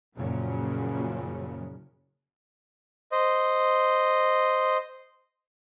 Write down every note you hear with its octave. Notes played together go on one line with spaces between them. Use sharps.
F#1 F#2 A#2 C#3 F3 F#3
C5 D#5